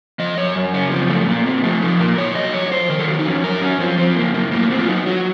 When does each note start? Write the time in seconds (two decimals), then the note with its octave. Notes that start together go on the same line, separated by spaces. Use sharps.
0.19 F3 D#5
0.37 F#2 C#5
0.55 F#2
0.74 C#3 C#4
0.91 F3 C4
1.09 F#2 A3
1.28 A#2 A#3
1.46 A#2 C4
1.64 F3 A3
1.81 F3 D#4
1.99 A#2 A#4
2.18 A#2 C#5
2.35 F#3 D#5
2.54 F2 C#5
2.71 F2 C5
2.89 D#3 A#4
2.99 A4
3.08 F#3 F#4
3.19 D#4
3.25 F2 C#4
3.44 F#2 A#4
3.62 F#2 C#4
3.80 F3 C4
3.98 F3 C4
4.16 F#2 A#3
4.34 F#2 A#3
4.51 A2 A#3
4.70 A2 C4
4.79 F4
4.88 F#3 D#4
5.06 F#3 F#4